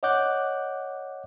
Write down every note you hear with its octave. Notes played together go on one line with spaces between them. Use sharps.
C#5 D#5 F#5 D6 F#6 G6